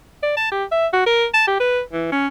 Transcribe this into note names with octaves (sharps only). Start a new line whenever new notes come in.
D5
A5
G4
E5
F#4
A#4
A5
G4
B4
E3
C#4